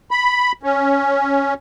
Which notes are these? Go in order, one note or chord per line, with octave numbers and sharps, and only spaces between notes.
B5
C#4